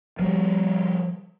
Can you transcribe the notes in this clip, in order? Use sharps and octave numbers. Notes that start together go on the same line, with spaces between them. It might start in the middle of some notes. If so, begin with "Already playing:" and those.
F3 G3